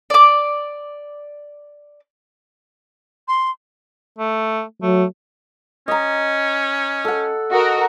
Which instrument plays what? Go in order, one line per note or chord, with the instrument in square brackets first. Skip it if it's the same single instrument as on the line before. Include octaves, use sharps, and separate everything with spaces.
[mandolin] D5 D6
[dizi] C6
[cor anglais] A3
[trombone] F#3 [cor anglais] A3
[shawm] C#4 [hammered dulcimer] D#5 A#5
[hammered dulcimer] A4 F#5
[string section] F#4 A#4 [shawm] D#5